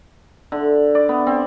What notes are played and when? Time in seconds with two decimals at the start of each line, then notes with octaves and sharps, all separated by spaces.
0.52 D3
0.95 D5
1.09 B3
1.27 C4